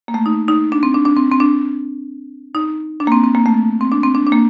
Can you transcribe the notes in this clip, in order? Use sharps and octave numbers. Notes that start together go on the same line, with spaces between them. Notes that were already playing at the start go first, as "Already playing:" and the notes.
A#3
A3
D#4
D#4
D4
C4
D4
D4
C4
C4
D4
D#4
D4
A#3
C4
C4
A#3
A3
C4
D4
C4
D4
D4
A#3